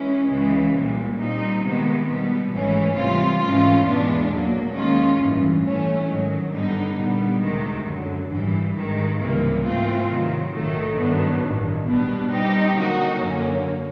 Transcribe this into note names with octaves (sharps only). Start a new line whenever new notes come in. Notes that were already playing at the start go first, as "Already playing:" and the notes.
Already playing: E3 G#3 C#4
C#2 C#3 E3 G#3
C2 A#2 G3
A#2 G3 C4 D#4
C3 D#3 G#3 B3
B2 G3 B3
G#1 G#2 E3 A3 C#4
C3 E3 G3 C4 F4
G#2 E3 A3 C#4 F4
E2 B2 G#3 B3 D4
B1 A#2 F#3 A#3
D#2 D#3 G#3 C#4 F4
A1 G2 E3
E3 A3 C#4
G#2 D#3 F#3
G2 D3 G3 B3 D#4
A#2 G3 B3
D2 C3 D#3 G#3
F#2 D3 F#3
G#1 G2 E3 G3
G#1 G2 D#3 G#3
C#2 C3 E3 G3 A#3
G#2 E3 A3 C4 F4
C3 D#3 F#3
A#1 G#2 D#3 F#3 A3
G2 D#3 F#3 B3 D4
A1 G2 D#3
B1 B2 G3 B3 D4
A#2 G3 C4 D#4 G4
D3 F#3 A#3 D#4 F#4
F#2 D3 F#3 A#3 C#4